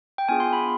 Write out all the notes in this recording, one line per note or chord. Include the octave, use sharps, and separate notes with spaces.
G5
B3 D4 F4 G#4 G#5
C6
B5